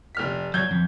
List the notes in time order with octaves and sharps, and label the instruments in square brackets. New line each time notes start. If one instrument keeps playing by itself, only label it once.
[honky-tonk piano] F1 F6 B6
[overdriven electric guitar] F#3 [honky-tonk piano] G6 G#6
[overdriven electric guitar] F2